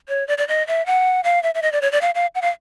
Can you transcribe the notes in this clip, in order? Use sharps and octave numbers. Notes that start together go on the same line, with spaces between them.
C#5
D5
D5
D#5
E5
F#5
F5
E5
E5
D#5
D5
C#5
D5
F5
F5
F#5
F5